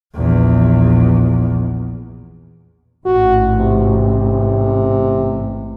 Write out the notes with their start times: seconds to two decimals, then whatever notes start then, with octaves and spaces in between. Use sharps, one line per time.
0.15 A#1 E2
3.06 A1 G#2 F#4
3.59 C3